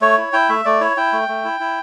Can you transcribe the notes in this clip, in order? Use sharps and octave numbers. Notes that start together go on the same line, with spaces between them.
A3 C#5
E4
E4 G5
A3 E5
A3 D5
E4 C#5
E4 G5
A3
A3
E4
E4